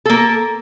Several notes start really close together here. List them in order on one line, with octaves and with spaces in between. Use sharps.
A4 A#3 A#4